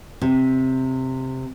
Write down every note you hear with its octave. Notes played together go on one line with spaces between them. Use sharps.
C3